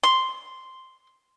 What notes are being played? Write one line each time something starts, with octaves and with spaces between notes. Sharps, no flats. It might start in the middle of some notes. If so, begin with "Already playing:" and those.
C6